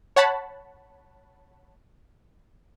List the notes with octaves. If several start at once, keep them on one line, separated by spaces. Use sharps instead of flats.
C#5 F#5 A5 B5